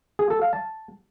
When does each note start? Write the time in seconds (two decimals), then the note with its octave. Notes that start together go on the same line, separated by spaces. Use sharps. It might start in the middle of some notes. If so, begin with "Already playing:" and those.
0.19 G#4
0.30 A4
0.42 F5
0.53 A5